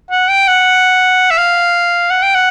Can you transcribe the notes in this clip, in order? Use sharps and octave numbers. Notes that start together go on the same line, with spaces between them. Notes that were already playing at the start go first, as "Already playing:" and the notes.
F#5
G5
F#5
E5
F5
F#5
G5
F#5